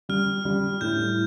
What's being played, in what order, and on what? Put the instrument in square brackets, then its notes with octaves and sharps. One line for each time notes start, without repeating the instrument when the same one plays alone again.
[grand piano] G3 [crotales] F6
[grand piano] G3
[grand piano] A2 [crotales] G6